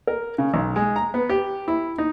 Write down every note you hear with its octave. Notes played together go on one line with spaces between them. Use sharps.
A#4
C#3
B1
G#3
A#5
B3
G4
E4
D#4